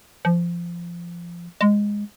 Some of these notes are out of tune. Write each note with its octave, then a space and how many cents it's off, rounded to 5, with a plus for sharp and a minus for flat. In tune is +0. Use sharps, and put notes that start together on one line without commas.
F3 -20
G#3 -10